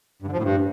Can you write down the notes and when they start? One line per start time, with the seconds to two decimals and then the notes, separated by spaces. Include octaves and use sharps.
0.22 G2
0.27 D3
0.32 F3
0.38 A2
0.43 G2